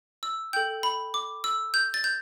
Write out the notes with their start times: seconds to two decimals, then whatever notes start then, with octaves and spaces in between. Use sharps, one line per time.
0.23 E6
0.53 A4 G5 G6
0.83 B5
1.14 D6
1.44 E6
1.74 G6
1.94 A6
2.04 G6